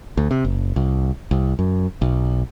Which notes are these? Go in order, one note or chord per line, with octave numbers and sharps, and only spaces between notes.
D2
C3
F#1
C2
C2
F#2
B1